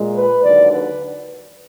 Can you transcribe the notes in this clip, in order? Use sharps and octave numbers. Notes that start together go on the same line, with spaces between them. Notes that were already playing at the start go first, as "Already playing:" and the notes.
Already playing: A#2 G#3
B4
D#2 D3 F#3 D5
B4